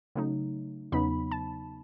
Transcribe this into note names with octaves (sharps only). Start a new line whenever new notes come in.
C#3 F#3 A3 D#4
E2 C#3 F#3 B3 D#4 B5
A5